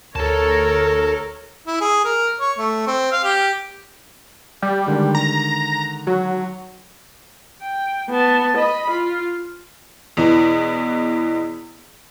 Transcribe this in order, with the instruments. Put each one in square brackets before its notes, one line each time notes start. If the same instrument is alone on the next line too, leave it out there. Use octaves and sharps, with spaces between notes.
[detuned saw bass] D2 [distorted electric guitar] A4 A5 [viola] A#4 C#5
[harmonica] E4
G#4
A#4
C#5
A3
C4
F5
G4
[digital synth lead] G3
[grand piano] D3 D#3 G#3
[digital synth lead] A#5
F#3
[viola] G5
B3 A5
D#5 B5
F4
[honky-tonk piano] E2 B2 E3